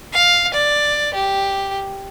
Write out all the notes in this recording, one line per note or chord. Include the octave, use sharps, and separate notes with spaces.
F5
D5
G4